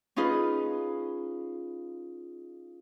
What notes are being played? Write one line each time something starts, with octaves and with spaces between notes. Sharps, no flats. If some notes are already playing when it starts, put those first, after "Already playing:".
C#4 D#4 F4 G#4 B4